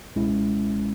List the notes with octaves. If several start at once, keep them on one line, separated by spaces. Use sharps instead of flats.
C#2 B2 G#3 C#4 E4